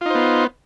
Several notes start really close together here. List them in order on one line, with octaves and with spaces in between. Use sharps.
F4 D#4 C5 B3